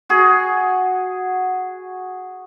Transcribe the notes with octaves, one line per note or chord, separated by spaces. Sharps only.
F#4 G#4